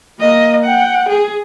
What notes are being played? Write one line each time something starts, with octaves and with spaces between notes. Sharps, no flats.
A#3 D#5
F#5 G5
G#4